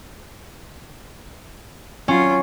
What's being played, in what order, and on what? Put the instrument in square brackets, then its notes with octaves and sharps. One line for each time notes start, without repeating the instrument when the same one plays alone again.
[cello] F#3 F4 [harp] C#4